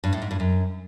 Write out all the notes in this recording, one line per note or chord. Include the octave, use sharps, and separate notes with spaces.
G2
A2
G#2
G2
F#2